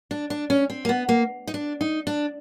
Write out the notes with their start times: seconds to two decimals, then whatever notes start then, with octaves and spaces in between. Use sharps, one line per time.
0.11 D4
0.30 D4
0.50 C#4
0.70 C4
0.85 A#3
0.89 B3
1.09 A#3
1.47 D#4
1.54 D4
1.81 D#4
2.07 D4